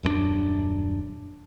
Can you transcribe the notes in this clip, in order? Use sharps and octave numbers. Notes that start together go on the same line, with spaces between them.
D#1 F#2 G#3 D4